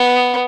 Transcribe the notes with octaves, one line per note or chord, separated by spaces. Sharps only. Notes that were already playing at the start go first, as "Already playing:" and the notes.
Already playing: B3